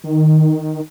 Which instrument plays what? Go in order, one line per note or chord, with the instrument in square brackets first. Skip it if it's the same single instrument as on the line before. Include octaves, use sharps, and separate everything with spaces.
[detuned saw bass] D#3